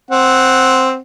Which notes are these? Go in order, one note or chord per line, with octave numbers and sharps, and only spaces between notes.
C4 F#5